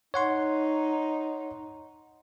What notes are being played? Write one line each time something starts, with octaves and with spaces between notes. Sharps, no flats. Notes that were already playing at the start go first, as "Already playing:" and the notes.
D#4 C#5 F#5 C6